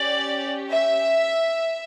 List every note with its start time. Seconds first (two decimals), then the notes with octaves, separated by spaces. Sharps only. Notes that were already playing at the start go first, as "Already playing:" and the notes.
Already playing: C#4 G4 D5
0.69 E5